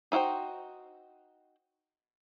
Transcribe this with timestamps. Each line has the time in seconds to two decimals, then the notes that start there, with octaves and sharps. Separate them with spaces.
0.12 D#4 E4 F#4 C5 G5